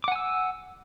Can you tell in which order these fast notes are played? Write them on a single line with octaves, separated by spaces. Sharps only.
D6 F#5 G#5 E6